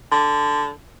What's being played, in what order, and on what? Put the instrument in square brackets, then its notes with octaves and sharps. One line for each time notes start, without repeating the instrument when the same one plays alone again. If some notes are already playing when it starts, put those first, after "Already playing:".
[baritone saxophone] D3